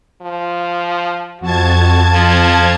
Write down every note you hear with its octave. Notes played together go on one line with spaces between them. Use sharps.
F3
F2 F#4 A5 G#6
F3